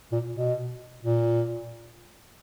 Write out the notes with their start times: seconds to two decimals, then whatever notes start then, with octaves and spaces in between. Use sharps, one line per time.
0.12 A#2
0.34 B2
1.03 A#2